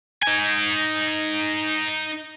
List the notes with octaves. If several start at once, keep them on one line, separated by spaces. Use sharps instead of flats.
D#4 G#5